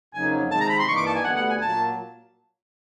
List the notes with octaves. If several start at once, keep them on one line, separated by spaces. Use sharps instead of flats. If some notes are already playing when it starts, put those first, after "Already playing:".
F2 C#3 F#3 A#3 D#4 G#5
C3 D#3 G#3 C4 D#4 A5
A#5
B5
C6
G2 E3 G3 A#3 D#4 C#6
D6
A5
G#5
D2 D3 G3 B3 F#5
F#5
G#5
A#2 F#3 A#3 A5